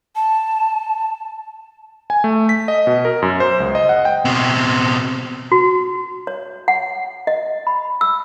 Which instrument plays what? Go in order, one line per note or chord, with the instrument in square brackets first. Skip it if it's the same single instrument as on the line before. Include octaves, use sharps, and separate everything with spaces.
[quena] A5
[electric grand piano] G#5
A3
B6
D#5
B2
A#4
F#2
C5
C#2
D#5
F#5
G5
[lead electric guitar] B2 C4
[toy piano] F#4
C#5
F#5
D#5
B5
E6